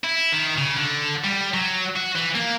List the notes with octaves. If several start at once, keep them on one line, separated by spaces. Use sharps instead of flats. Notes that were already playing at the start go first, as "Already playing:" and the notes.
E4
D#3
C#3
D3
G3
F#3
F#4
E3
A#3